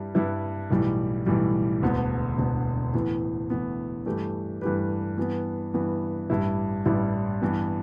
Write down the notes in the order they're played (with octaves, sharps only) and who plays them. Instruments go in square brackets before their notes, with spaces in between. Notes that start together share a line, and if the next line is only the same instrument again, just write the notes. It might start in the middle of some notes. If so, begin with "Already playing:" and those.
Already playing: [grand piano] G2 G3 E4
G2 G3 E4 B4
B1 A2 E3 G3
B1 A2 E3 G3
E1 D2 D3 B3
E1 D2 D3 B3
A2 E3 B3
A2 E3 B3
G2 E3 A3 G4 B4
G2 E3 A3 G4 B4
G2 E3 B3
G2 E3 B3
A1 G2 G3 E4
A1 G2 G3 E4
G2 E3 B3